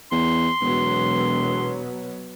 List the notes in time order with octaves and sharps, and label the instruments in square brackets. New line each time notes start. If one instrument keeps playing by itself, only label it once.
[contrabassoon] E2 [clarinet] C6
[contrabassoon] E1 [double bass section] B2 F#3 B3